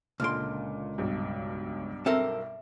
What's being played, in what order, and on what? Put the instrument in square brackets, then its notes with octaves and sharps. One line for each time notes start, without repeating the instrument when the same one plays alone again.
[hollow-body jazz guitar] C#2 D3 C6 [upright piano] A#2 [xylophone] F6 D7
[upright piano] B1 G2
[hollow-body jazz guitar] C4 A4 A#4 [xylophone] E5